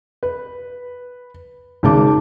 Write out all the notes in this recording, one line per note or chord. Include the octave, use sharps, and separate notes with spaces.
B4
G#1 C#3 A5 D6